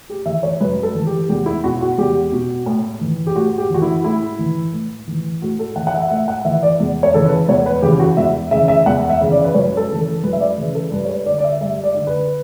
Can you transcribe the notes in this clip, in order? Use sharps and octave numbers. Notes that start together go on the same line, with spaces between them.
G4
E3 E5
C#5
F#2 B4
A4
E3
G4
E2 G4
E4
B2 F#4
F#4
E2 G4
B2
A2
E3
G4
A2 F#4
G4
E3 F#4
E4
A2 E4
E3
A2
E3
A2 F#4
A4
E3 F#5
F#5
E5
A2 E5
F#5
E3 E5
D5
E2
C#5
C#3 E3 A4
B4
E2 C#5
B4
C#3 E3 G4
F#4
E2 E5
C#3 E3 E5
E5
E2 F#5
E5
C#3 E3
D5
B4
F#2 C#5
A4
C#3 E3
A4
F#2 B4
E5
D5
C#3 E3 B4
A4
G2 B4
C#5
B4
D3 D5
D5
E5
G2 E5
D5
D3
B4